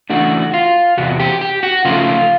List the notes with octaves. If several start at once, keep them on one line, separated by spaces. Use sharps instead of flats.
C#3 E3 A3 D4 F#4
F4
E2 C3 F#4
G4
G4
F#4
C#3 F3 A3 F4